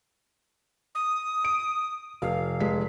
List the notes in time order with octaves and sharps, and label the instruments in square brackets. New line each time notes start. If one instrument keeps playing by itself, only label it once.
[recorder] D#6
[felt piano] D7
[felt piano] F1 [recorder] F5
[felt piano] F1 G#3 B6